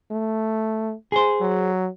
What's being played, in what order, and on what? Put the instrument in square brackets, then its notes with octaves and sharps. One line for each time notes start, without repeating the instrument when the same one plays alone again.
[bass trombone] A3
[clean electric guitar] G#4 C5
[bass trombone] F#3